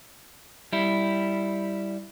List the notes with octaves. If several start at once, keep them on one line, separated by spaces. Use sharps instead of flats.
G3 E4